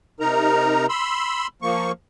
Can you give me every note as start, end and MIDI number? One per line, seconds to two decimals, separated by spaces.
0.20 0.86 48
0.20 0.86 63
0.20 0.86 70
0.20 0.86 82
0.89 1.47 83
0.89 1.47 84
0.89 1.47 88
1.62 1.92 53
1.62 1.92 58
1.62 1.92 85